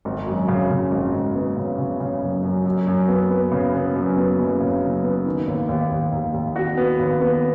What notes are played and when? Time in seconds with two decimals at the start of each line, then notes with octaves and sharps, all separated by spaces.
0.05 G#1
0.27 F#2
0.48 C#3
0.70 C#3
0.91 G#1
1.13 G#1
1.35 B3
1.56 C#3
1.78 C#3
2.00 C#3
2.22 F#2
2.43 F#2
2.65 F#2
2.87 F#2
3.08 B3
3.31 B3
3.52 C#3
3.74 B3
3.96 F#2
4.17 B3
4.40 F#1
4.60 C#3
4.82 F#1
5.04 B3
5.26 D#3
5.48 D#2
5.69 D#2
5.91 D#2
6.12 D#2
6.34 D#2
6.56 F#4
6.77 B3
6.99 D#2
7.21 B3